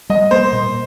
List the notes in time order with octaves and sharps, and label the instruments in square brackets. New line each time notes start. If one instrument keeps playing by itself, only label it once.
[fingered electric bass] G3 [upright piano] D#5
[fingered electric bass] A#3 [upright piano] C5
[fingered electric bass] A#2